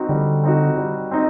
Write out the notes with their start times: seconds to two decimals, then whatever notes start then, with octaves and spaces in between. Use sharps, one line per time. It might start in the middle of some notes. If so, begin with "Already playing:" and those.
Already playing: C4 D#4 F#4
0.09 D3 G3
0.43 C4 D#4 F#4
0.77 G3
1.11 C4 D#4